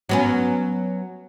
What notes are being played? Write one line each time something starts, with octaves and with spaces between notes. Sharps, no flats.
F#3 B3 C#4